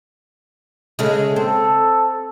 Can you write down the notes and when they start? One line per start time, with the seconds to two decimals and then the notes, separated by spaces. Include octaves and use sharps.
0.99 C#3 G#3 A3
1.36 C4 A4